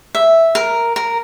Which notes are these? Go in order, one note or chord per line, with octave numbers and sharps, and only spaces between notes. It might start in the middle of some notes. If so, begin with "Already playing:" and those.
E5
A#4
A#4